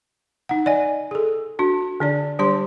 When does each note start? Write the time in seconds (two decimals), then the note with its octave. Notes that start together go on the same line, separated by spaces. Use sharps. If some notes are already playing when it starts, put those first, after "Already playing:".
0.49 D#4 F#5
0.66 D5 D#5 G#5
1.11 G#4 A4
1.59 D4 F#4
2.00 D3 D4 D5
2.39 G3 D4 G4 C5 C6